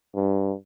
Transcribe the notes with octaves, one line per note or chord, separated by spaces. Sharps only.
G2